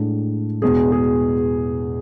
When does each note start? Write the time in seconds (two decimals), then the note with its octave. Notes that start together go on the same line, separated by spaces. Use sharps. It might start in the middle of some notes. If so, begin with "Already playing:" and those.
Already playing: A2 G#3 D4
0.62 E2 B2 G#3 B3 G#4
0.92 G#4